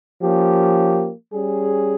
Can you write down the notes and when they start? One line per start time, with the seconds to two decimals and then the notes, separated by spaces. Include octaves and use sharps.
0.22 F3 A#3 C#4 G4
1.33 G3 C#4 G#4